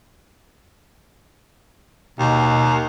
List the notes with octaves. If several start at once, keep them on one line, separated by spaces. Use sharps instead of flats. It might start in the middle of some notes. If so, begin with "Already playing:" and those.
D#2 B2